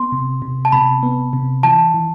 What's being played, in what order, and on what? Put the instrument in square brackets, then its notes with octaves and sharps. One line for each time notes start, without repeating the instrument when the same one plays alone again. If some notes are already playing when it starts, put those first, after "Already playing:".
Already playing: [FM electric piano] B3 [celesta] C6
[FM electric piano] C3
C3
[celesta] A5
[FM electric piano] C3 [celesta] B5
[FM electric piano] B3
C3
[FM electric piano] E3 [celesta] A5
[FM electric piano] E3